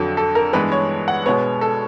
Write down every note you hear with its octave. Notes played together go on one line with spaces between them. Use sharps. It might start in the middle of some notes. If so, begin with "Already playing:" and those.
Already playing: F2 D3 F#3 A4
A4
A#4
G2 E3 G#3 B3 B4
C#5
F#5
B2 G#3 B3 C#5
A4